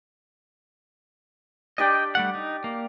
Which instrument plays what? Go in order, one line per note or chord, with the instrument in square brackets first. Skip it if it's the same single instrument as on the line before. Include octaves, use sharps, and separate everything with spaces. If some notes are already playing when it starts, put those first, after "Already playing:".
[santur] D4 G4 D5 [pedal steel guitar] D#5 G5
[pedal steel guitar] G3 A3 F#5
D#4
A#3